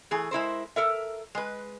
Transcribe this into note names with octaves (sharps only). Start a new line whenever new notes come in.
E3 A3 G#4
G#3 E4 A#4 C5
A4 A#4 E5
G#3 B4